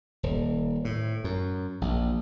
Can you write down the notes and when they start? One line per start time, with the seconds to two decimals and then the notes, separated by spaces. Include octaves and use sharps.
0.23 D#1
0.85 A2
1.24 F#2
1.81 A#1